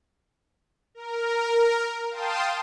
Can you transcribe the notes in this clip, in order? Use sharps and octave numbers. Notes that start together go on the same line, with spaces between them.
A#4
F5 G5 A5 C6 D#6